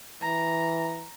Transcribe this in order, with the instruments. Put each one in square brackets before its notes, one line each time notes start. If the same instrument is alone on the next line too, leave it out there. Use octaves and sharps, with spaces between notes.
[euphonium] E3 [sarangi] A#5